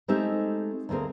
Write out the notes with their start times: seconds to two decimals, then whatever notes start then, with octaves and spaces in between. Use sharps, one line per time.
0.08 G#3 A3 C4 D#4 G4 E5
0.89 D2 A#3 C4 G#4 A#4